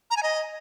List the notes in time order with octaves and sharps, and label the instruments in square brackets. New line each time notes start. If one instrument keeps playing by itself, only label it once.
[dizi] A#5
G#5
D#5